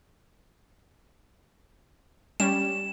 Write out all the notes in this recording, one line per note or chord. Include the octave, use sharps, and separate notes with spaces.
G3 C#4 E7